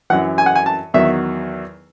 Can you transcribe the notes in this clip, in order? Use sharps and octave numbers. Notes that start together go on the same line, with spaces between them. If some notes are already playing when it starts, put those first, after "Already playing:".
F#2 E3 F#5
G#5
F#5
G#5
A5
E2 D#3 F#3 E5